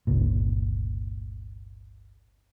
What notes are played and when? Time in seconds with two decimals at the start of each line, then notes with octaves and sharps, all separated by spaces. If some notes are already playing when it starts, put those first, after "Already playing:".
0.07 G1 C#2 A#2